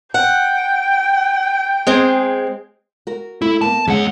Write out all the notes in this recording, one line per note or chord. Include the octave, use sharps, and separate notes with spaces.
F#5 G5
G#3 C4 G#4
F#4 A#4
A3 E4
A#3 B3 A5
E2 G#3 C#4 F#5